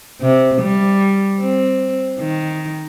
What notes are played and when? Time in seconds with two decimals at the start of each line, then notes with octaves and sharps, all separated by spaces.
0.22 C3
0.62 G3
1.40 C4
2.20 D#3